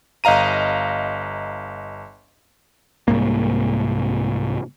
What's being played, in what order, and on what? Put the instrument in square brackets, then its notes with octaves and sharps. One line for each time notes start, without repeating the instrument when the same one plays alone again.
[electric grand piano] G1 D#5 F5 A#5 D#7
[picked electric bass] C2 G#2 A#3